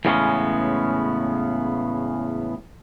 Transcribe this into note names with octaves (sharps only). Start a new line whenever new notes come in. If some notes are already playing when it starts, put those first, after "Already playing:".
E2 A2 C#3 G#3 B3 C#4